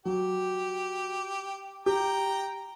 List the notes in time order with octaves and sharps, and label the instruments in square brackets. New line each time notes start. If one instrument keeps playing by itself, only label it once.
[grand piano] F#3 [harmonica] G4
[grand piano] G4 [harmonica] G5 A#5